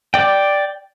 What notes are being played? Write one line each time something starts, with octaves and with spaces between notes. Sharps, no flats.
D5 G5